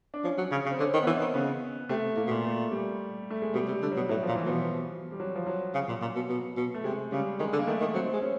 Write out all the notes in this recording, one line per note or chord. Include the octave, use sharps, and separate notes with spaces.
D4
F3 C#4
F#3
C#3
C#3
C4
D3 C#4
D#3
B3
E3 C4
D#3
C#3 B3
C3 A3
A2 A#3
B2
A#2
A3
G3
A3
G#3
B2 G3
C3
G3
D3
B2 F#3
A2 F#3
F3
A#2
E3
B2 F3
G3
F#3
F3
F#3
C#3
A#2
A#2
B2
B2
B2
A3
C3 G#3
C#3 G3
D#3 G#3
D3
A#3
D#3 A3
D#3
F#3 C4
G#3
C#4